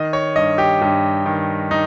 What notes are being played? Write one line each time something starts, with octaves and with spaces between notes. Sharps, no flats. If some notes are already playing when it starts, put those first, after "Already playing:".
Already playing: D#3 D#5
C#5
G2 D#5
G4
G2 G4
D#3
D#3 D#4